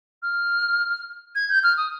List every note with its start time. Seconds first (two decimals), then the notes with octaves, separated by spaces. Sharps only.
0.22 F6
1.35 G#6
1.49 G6
1.63 F6
1.77 D#6